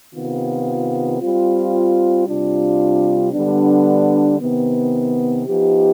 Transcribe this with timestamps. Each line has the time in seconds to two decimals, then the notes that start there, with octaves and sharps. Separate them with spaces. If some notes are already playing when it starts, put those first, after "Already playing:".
0.13 C3 D#3 B3 F4
1.20 G3 C4 F4
2.27 C3 G3 D4 F4
3.32 D3 G3 B3 D4
4.39 C3 D#3 B3
5.45 F3 B3 D#4 G4